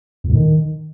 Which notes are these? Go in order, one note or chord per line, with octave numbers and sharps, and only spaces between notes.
E2
A2
D#3